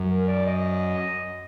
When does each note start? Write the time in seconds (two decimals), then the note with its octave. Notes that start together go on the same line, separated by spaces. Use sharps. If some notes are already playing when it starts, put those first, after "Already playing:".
Already playing: F#2
0.09 A#4
0.27 D5
0.46 D#5